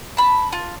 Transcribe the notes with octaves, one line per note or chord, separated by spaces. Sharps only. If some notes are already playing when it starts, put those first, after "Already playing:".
A5 B5
F4